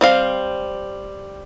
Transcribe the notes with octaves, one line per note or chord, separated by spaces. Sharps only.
G3 C4 F5